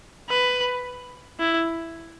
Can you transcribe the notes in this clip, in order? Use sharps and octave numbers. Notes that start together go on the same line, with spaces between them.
B4
E4